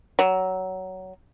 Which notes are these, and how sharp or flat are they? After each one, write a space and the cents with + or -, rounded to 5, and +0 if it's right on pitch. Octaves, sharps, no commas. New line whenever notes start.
F#3 +15